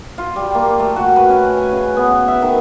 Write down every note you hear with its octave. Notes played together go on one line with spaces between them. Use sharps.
F4
G3
A#3
A3
F#4
B4
C#4
G#5
C#3
B3
E5
D#3